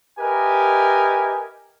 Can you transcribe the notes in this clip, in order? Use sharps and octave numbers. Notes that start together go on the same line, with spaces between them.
G4 A#4 B4 D#5 E5 G#5